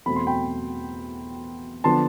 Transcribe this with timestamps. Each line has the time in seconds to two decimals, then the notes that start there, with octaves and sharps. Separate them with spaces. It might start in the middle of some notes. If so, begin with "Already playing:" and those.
0.06 E2 B2 A3 C4 B5
0.16 C6
0.27 G5 B5
1.84 D3 F3 B3 D4 A5 C6